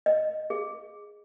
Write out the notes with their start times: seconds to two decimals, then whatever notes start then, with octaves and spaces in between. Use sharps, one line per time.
0.06 D#5
0.50 G#4